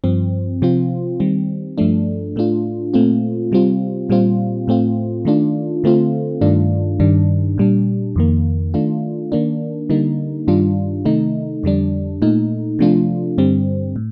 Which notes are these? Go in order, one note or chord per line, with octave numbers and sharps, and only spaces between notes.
G2 F3 C4
C3 F3 C4 F4
D#3 G3 C4
G2 F3 A3 D4
A2 A3 D4 F4
A#2 A3 C4 F4
C3 G3 C4 F4
A#2 G3 C4 F4
A2 A3 C4 F4
D#3 A3 D4 F4
D3 A3 C4 F4
G2 D#3 A3 D4 F4
G2 D#3 G3 D4
A#2 G3 D4
F2 D#3 A#3
D#3 A3 D4 F4
D#3 A#3 D4
D3 G3 A#3 D#4
G2 D#3 G3 D4 F4
C3 D#3 A3 D#4
F2 D3 G3 D4
A#2 A3 D#4
C3 F3 A3 D4 F4
G2 D3 G3 C4
A2